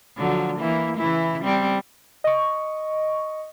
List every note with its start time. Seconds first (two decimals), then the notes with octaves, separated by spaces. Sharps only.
0.17 D3 F3 F#3
0.59 E3 A#3 E4
0.97 C#3 E3 E4
1.44 G3 C4
2.24 D#5 C#6